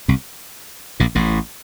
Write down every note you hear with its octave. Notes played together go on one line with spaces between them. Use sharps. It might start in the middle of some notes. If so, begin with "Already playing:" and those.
C2 C3
A#1 A#2
A1 A2